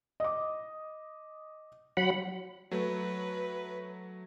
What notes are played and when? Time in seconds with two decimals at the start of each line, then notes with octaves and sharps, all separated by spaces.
0.20 D#5 D6
1.97 F#3 F#5 B5
2.71 F#3 A3 B4